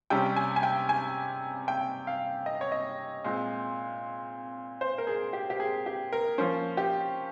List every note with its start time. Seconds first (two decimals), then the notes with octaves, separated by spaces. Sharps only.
0.10 C3 G3 C#4 G5
0.36 G#5
0.56 G#5
0.63 G5
0.89 G#5
1.68 G5
2.07 F5
2.46 D#5
2.61 C#5
2.72 D#5
3.24 A#2 G#3 C4
4.81 C5
4.98 A#4
5.07 G#4
5.33 G4
5.50 G4
5.60 G#4
5.86 G4
6.13 A#4
6.38 F3 A#3 C#4 C5
6.77 G4